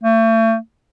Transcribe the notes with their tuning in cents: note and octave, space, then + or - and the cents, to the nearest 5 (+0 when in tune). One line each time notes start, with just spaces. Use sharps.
A3 +40